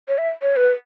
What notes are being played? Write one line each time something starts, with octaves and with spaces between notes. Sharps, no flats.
C#5
E5
C#5
B4